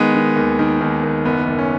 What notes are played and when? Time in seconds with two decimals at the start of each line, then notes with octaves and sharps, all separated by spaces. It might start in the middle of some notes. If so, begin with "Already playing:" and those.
Already playing: D#3 G#3 B3
0.15 D#3
0.36 D#2
0.59 D#3
0.81 D#2
1.03 D#2
1.25 F#1 B3
1.47 F#1
1.59 C#4